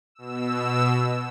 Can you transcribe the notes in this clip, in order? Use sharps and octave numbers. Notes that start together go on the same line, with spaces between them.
B2 E6